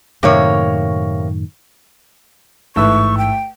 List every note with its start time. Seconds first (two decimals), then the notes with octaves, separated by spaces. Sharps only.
0.23 F#2 A2 C3 D#3 A#3 C#5
2.76 A1 G#2 A3 E4 B4 C#6 E6
3.18 G5